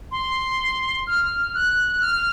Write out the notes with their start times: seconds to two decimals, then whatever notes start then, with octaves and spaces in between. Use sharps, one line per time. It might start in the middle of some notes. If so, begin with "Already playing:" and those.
0.11 C6
1.07 F6
1.55 F#6
2.01 F6